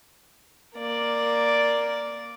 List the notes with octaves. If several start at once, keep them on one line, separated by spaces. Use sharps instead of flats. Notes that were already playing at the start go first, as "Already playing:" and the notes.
A#3 D5